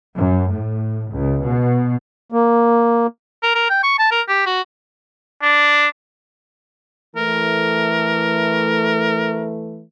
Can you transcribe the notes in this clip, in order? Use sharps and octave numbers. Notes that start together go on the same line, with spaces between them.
F#2
A2
C#2
B2
A#3
A#4
A#4
G5
C#6
A5
A#4
G4
F#4
D4
E3 A3 A#4